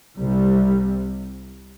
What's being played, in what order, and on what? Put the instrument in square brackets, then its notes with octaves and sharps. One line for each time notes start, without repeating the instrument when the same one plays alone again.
[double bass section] C2 C3 G3